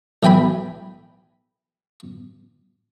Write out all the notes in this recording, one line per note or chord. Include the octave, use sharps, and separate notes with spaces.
B1 E3 G5 G#5 B5